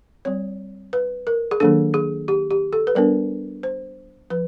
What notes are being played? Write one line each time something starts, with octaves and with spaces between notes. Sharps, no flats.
G3 C4 C#5
B4
A#4
G#4
D#3 F#3 A#3 D4 A4
G#4
G4
G4
A4
B4
G3 B3 D4 A#4
C5
F3 B4